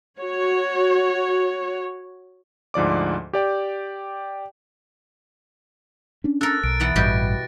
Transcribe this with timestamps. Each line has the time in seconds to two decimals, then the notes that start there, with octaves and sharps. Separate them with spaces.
0.18 F#4 C#5
2.74 D2 G#2 F3 D5 D6
3.33 G4 D5 G5
6.24 C#4 D4
6.41 A4 A#4 F#6 A6
6.64 B1 D7
6.80 E3 B3 F#5
6.96 A1 G2 B2 G3 G4 A#6 D7